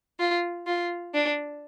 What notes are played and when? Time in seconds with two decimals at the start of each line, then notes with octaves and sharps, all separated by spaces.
0.20 F4
0.67 F4
1.14 D4